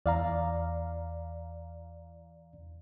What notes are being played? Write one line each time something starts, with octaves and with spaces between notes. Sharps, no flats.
E2 D5 F5 A#5